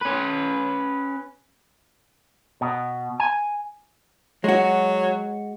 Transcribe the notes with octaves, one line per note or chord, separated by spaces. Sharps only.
C#4 B4
B2
G#5
F#3 G#3 F#4